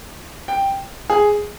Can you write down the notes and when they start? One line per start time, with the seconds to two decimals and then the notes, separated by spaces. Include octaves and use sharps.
0.48 G5
1.10 G#4